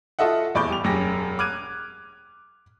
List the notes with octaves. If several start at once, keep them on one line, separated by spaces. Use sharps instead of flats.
F4 F#4 A4 D#5 E5 F#5
D#1 E2 D5 B5 C#6 G6
G3 F7
E1 F#2 G4 A#6
D6 F6 F#6 G#6 D#7